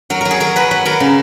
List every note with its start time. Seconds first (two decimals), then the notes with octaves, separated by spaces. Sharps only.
0.10 F#3 A#4
0.21 F#3 A#4
0.31 G#4
0.40 F#3 A#4
0.56 F#3 B4
0.71 F#3 B4
0.85 F#3 A#4
1.00 C#3